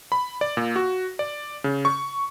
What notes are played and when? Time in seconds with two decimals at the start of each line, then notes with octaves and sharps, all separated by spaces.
0.12 B5
0.41 D5
0.57 A#2
0.76 F#4
1.19 D5
1.64 C#3
1.85 C#6